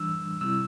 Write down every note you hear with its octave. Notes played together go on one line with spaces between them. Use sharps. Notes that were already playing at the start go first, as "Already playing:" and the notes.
Already playing: E3 G3 D4 E6
C3 G3 C4 E4 E6